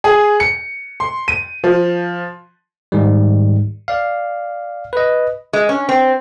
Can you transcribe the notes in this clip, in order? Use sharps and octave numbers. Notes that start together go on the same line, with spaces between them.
G#4
C#7
C6
D#7
F3
G#2 D#3 G3
D5 F5
B4 D#5
G#3
C#4
C4